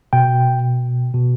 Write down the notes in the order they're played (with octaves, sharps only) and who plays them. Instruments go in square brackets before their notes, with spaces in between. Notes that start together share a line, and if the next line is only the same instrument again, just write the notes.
[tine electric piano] B2 G5
B2